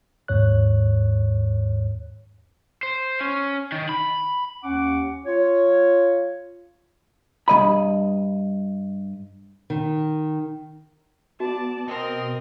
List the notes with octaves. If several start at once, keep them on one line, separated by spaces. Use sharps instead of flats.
D#2 G#2 C#5 F#6
C5
C#4
D#3
B5
D#2 C#4 F#5 D6
F4 C#5
G2 F#3 D#5 B5
D#3
B3 F#4 D5 A5
B2 C4 A#4 D#5